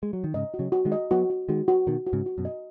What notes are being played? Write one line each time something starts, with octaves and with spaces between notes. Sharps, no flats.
G#3
F#3
D#3
G#2 C#3 D#5
F#4
C#3 F#3
F#4
D#3 G#3
D#5
F#3 B3 F#4
F#4
D#3 G#3 F#4
F#4
B2 D#3 F#4
F#4
G#2 C#3
F#4
F#2 B2
D#5